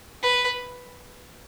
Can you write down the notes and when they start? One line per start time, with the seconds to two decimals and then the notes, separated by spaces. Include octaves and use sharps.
0.23 B4